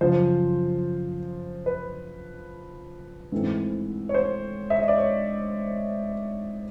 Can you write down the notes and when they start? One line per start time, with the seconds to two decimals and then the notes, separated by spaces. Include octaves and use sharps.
0.01 F#2 C#3 F3 C5
1.66 B4
3.32 G#2 E3 A3 C4
4.09 C#5
4.14 C5
4.70 E5
4.80 D#5
4.88 D5
4.98 C#5